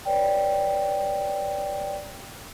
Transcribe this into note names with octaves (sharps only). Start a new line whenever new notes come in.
B4 C#5 D5 G5